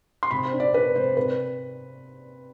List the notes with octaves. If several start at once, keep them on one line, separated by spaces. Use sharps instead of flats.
C6
C3 B5
C5
D4
D5
D4 B4
C3 C5
C3 B4